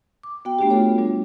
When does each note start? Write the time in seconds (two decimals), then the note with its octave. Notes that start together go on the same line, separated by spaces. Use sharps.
0.23 D6
0.45 B3 F#4 G5
0.59 A3 B3 D4 F#4 G4
0.70 F4 F#4 A4 C#5
0.98 G3 D4